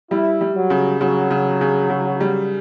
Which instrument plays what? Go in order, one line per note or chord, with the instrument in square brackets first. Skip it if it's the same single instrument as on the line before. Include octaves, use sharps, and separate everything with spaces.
[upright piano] G3 [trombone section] E4
[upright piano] G3
[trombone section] F#3
[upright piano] C#3
[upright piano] C#3 [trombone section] F#3
[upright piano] C#3
C#3
C#3
G3